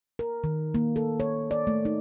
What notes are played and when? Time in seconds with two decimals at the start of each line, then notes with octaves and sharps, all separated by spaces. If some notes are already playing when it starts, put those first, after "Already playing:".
0.19 A#4
0.44 D#3
0.74 A#3
0.96 A4
1.20 C#5
1.51 D5
1.67 A3
1.85 D#4